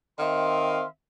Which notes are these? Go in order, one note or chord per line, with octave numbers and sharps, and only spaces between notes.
D#3 C4 E5 F5 C6